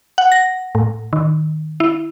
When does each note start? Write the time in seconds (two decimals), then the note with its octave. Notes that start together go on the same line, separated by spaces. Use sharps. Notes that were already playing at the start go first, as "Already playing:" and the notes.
0.18 F#5
0.32 A#6
0.75 A2
1.13 D#3
1.80 E4